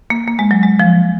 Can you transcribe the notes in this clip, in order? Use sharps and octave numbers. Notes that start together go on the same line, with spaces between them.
A#3
A#3
G#3
F#3
G#3
F3